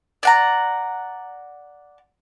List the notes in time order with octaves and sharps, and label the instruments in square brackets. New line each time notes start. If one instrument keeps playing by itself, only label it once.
[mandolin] D5 F#5 A#5